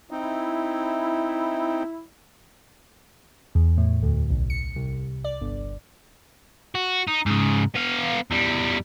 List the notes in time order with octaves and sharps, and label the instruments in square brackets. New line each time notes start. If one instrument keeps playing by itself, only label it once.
[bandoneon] C4 D#4 [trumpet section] E4
[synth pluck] E2
A2
D2
B1
C#7
C2
D5
G1
[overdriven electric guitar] F#4
D#4
G#2 C#3
B3 F5
E2 G3